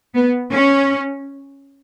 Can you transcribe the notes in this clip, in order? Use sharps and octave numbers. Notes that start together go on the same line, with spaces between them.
B3
C#4